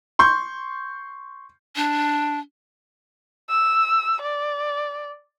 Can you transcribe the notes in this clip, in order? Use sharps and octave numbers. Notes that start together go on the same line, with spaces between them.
C6 C#6 G6
D4
E6
D5